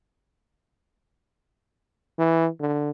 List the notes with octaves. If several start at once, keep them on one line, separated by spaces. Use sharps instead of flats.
E3
D3